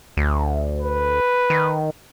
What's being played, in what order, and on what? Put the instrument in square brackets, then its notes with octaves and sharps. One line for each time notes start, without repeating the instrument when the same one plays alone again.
[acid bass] D2
[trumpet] B4
[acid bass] D#3